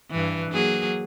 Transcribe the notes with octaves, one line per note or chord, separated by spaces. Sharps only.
G2 E3
F#3 A#3 G#4